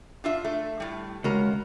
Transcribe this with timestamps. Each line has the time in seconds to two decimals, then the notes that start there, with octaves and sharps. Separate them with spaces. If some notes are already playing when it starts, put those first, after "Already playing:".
0.24 D4 F4 E5
0.45 A3
0.80 A2 G3
1.24 C#2 F#4 A#4